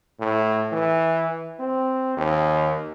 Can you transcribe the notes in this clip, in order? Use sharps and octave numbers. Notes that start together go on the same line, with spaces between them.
A2
E3
C4
D#2